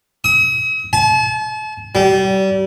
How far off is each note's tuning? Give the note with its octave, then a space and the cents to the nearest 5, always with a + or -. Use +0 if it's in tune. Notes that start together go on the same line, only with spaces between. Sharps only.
D#6 +45
A5 -40
G3 -30